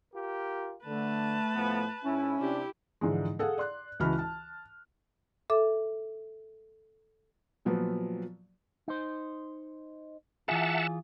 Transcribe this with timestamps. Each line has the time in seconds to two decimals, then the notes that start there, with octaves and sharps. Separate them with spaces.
0.13 F4 G4 A#4
0.85 D3 A3 B4 A5
1.54 A2 F3 B3
2.04 G#2 C#4 E4
2.38 C3 D4 E4 G4
3.01 G#2 D3 E3 F3 G#3
3.39 G#4 A4 F5 F#5
3.58 D5 C6 F#6
4.00 C#2 E3 F#4 A5 B5 F6
4.19 A5
5.50 A4 E5 D6
7.65 A#2 F3 F#3 B3
8.88 D#4 C5
10.48 E3 F4 G#4 E5 F#5 A5